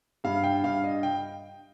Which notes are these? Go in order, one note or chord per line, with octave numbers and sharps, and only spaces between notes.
G2 F5
G5
G2 F5
D#5
G5